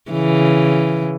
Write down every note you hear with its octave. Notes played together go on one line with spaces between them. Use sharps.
C#3 E3